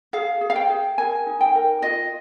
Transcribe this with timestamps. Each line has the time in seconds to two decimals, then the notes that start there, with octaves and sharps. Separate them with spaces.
0.13 G#4 F5
0.41 G#4
0.50 F5
0.56 G5
0.70 G#4
0.98 A#4 G#5
1.26 D#4
1.41 G5
1.55 A#4
1.82 F4 D#5